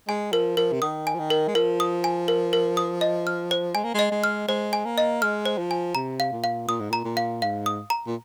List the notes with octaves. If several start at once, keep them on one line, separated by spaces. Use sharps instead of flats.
G#3 G#5
F3 A#4
F3 A#4
C3
D#3 D#6
G#5
F3
D#3
A#4
G#3
F3 A#4
D#6
G#5
A#4
A#4
D#6
D#5
F6
C5
G#3 G#5
A#3
G#3 D#5
G#3
F6
G#3 C5
G#5
A#3
D#5
G#3 F6
C5
F3
G#5
C3 A#5
F5
A#2
F5
A#2 D#6
G#2
A#2 A#5
A#2
F5
G#2 F5
D#6
A#5
A#2